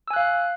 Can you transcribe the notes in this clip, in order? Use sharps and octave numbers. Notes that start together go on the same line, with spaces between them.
F5 G#5 E6 F#6